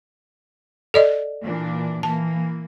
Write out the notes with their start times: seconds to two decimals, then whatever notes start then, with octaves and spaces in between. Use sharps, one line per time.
0.94 A4 D5 D#5
1.41 A#2 E3 D4
2.03 E3 A#3 A5